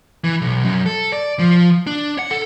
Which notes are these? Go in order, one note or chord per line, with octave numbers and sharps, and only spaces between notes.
E3
B1
F#2
A4
D5
F3
D4
F#5
A4